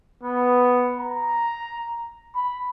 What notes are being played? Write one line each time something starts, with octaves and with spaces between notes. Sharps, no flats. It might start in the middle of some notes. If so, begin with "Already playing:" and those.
B3
A#5
B5